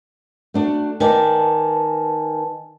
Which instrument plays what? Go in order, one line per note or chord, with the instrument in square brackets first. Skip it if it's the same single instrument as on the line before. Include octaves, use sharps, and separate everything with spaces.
[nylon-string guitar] A3 D4 F#4
[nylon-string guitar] D#3 D5 [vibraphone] B4 G#5 A5